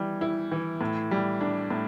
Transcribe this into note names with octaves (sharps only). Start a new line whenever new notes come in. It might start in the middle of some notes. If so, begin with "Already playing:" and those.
Already playing: E3 G3
E4
E3
A2
G3
D4
A2